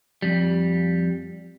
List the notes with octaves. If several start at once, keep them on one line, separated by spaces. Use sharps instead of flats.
F2 G3